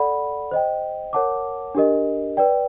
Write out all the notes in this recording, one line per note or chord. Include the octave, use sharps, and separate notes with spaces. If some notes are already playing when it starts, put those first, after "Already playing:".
Already playing: A4 D5 F#5 B5
C5 D#5 G5
A#4 C#5 F#5 A5 D6
D4 G4 A#4 D#5
B4 D5 G5